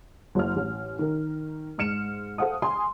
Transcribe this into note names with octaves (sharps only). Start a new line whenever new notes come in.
F#1 F#3 E4 F6
A1
D#3 A#4
G#2 F6 C#7 E7
A4 C5 F5 F#5 D#6
G#5 C6 D#6